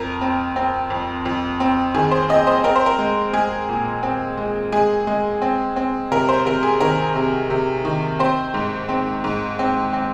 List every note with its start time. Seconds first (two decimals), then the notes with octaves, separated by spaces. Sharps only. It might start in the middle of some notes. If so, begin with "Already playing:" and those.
Already playing: F2 A#4
0.21 C4
0.56 C4
0.90 F2
1.25 F2
1.60 C4
1.95 D#3 G#4
2.11 C5
2.29 C4 D#5
2.47 C5
2.64 C4 A#4
2.76 C5
2.86 A#4
2.99 G#3
3.33 G#3 G#4
3.69 A#2
4.03 C4
4.37 G#3
4.72 G#3 G#4
5.07 G#3
5.42 C4
5.76 C4
6.11 C3 A#4
6.29 C5
6.46 C3 A#4
6.63 G#4
6.80 D#3 A#4
7.16 C3
7.50 C3
7.85 D#3
8.19 C4 C5
8.54 G#2
8.89 C4
9.24 G#2
9.59 C4
9.93 C4